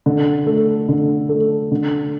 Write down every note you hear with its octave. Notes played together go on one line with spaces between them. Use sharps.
D3
A3
D3
A3
D3